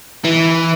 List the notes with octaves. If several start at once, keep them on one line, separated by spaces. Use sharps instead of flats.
E3